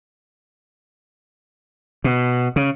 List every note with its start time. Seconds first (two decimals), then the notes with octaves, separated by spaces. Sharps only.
2.04 B2
2.56 C#3